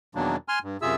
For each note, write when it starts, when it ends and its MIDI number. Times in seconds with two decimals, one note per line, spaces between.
0.15 0.36 40
0.15 0.36 47
0.15 0.36 51
0.15 0.36 54
0.15 0.36 58
0.15 0.36 62
0.48 0.59 80
0.48 0.59 84
0.48 0.59 89
0.63 0.77 43
0.82 0.96 42
0.82 0.96 48
0.82 0.96 65
0.82 0.96 68
0.82 0.96 76
0.82 0.96 88